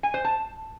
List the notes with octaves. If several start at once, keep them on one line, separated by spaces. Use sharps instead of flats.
G#5
C5
A5